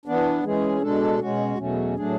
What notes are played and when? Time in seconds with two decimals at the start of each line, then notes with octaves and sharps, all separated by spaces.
0.06 E3 B3 D4
0.43 E3 G#3 C#4 G#4
0.82 B2 G#3 D4 A4
1.21 B2 G#3 C#4 F#4
1.58 E2 B2 F#3 A3 C#4
1.96 A2 F#3 A3 D4 G#4